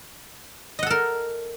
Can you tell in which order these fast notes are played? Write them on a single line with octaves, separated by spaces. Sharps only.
D#5 F#5 A4 A#4